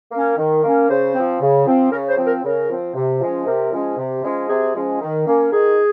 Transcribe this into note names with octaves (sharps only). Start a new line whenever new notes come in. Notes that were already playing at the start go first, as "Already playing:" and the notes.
A#3 C#4
D#3
A#3 C#4
C#3 C5
F3 C4
C#3
F3 C4
C#3 A#4
C5
F3 C4
A#4
C#3 A#4
F3 C4
C3
F3 G#3 C#4
C3 A#4
F3 G#3 C#4
C3
F3 G#3 C#4
C3 G#4
F3 G#3 C#4
D#3
A#3 C#4
D#3 G#4